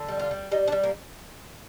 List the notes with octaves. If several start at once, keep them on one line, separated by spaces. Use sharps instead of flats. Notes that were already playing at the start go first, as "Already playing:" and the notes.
Already playing: D3
G3
F4
G3
G3 D#4
D4
G3
A#3